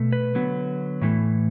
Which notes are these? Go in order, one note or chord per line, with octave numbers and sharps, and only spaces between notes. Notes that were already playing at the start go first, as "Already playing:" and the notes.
Already playing: B2 A3
B4
D3 F#3 B3
A2 E3 A3